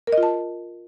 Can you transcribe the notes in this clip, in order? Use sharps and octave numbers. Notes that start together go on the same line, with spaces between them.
A#4
D#5
F4
A5